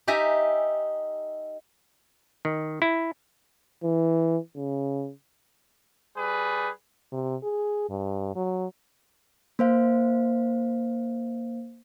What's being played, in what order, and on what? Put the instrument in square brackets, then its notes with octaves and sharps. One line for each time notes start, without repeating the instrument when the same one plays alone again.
[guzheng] D#4 G4 E5 G#5 A#5
[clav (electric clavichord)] D#3
E4
[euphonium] E3
C#3
[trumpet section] G3 G#4 B4
[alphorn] C3
G#4
G2
F#3
[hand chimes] A#3 C5 F5